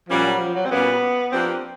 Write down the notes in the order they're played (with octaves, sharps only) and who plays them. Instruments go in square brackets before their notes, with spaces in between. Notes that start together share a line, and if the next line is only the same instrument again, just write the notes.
[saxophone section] A#2 G3 A#3 C#4 F#4 [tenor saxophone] F3
[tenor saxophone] F#3
F3
F#3
C4
[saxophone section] A#2 G3 A#3 C#4 F#4 [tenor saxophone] B3
[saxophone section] F3 A#3 D4 G4 B4 [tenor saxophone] C4